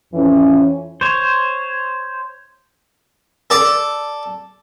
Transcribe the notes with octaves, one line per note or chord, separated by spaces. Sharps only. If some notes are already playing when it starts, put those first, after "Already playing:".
F2 E3 C#4
C5 C#5
A4 D5 A5